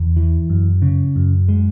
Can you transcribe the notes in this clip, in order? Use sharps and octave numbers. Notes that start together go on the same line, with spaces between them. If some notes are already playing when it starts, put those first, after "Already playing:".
Already playing: E2
E3
F#2
C#3
F#2
G#3